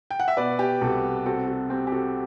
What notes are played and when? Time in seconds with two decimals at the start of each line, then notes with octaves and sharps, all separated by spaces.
0.10 G5
0.20 F#5
0.28 E5
0.37 B2 B4 D5
0.59 G4
0.81 C2 F#4 A4
1.26 C4 F#4 A4
1.48 F#4
1.70 C4 G4
1.87 G4
1.92 F#4 A4